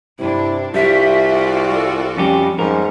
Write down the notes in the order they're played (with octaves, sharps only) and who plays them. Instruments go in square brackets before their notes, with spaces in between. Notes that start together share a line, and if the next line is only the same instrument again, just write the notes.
[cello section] G2 D4 [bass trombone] C3 [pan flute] E4
[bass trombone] C2 [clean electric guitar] G3 [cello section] F4 F#4 D5 [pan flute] E5
[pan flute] A4
[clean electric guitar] F2 C#4 G4 [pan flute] G3
[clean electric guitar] F2 A#4 [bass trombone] G#2 [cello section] C#4